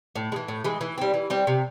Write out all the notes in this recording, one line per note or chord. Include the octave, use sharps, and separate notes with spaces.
A2
G#3
E3
A2
E3 G#3
E3
G3 C4
E3
G3 C4
C3